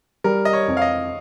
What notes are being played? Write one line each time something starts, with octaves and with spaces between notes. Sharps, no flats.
G3 A#4
D#5
C#5
F2
F5
D#5